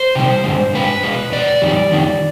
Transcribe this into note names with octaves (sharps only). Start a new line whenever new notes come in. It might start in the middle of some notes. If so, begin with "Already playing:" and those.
Already playing: C5
C3 D#3 G3
G2 D3 G#3
G2 D3 G#3 B4
B2 G#3
B2 G#3 D5
F2 D#3 G3
F2 D#3 G3